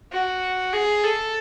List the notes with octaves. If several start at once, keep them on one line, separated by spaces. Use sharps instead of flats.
F#4
G#4
A4